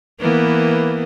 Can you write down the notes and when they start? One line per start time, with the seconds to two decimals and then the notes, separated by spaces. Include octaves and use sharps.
0.20 E3 A#3 B3